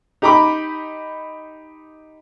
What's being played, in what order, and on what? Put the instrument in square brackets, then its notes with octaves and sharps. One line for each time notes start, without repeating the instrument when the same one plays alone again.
[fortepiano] D#4 G4 A#5 B5 D6